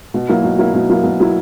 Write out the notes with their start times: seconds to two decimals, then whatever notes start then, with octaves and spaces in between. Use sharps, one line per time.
0.14 B2
0.29 F#3 A#3 E4
0.44 B2
0.59 F#3 A#3 E4
0.74 B2
0.90 F#3 A#3 E4
1.04 B2
1.20 F#3 A#3 E4